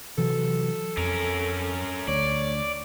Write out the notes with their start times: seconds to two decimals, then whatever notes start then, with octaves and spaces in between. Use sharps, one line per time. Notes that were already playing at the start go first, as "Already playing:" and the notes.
0.18 C3 E3 F#3 A4
0.97 F2 C#4 A#4
2.08 D2 C#5 D5